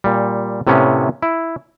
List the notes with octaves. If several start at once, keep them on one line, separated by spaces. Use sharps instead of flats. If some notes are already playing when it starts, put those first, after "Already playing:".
A#2 G3
A2 C3 A#3 B3 C#4
E4